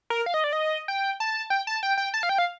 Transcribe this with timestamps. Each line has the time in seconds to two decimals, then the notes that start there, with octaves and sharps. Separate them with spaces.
0.10 A#4
0.26 F5
0.34 D#5
0.44 D5
0.53 D#5
0.88 G5
1.20 A5
1.50 G5
1.67 A5
1.83 G5
1.97 G5
2.14 A5
2.23 F5
2.29 G5
2.38 F5